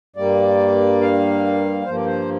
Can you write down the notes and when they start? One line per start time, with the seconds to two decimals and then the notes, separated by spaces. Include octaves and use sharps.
0.16 G2 G3 A#3 D5
1.01 F5
1.86 G2 F3 A#3 C5
1.96 D5
2.05 C5